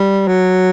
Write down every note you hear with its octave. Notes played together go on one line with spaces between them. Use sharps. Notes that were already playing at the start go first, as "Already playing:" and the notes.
Already playing: G3
F#3